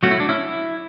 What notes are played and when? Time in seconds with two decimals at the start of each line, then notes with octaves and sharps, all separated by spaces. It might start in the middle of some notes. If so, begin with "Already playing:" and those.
0.03 F#3 A3 C#4 F#4
0.11 E4
0.20 D4
0.29 C#4 E4